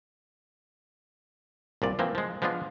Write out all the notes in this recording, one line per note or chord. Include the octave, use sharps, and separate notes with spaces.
C2 A#2 D5
E3 F3 A#3 C4
F3 G#3
F3 G#3 B3 D4 F4